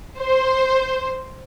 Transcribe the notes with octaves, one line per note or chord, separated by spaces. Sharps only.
C5